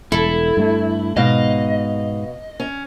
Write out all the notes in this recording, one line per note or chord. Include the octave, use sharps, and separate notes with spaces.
E1 E4 A4
G2 A3
G#2 B2 D#5 F5
C#4